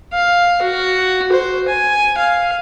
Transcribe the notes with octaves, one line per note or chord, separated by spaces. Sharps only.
F5
F#4
C5
G#5
F5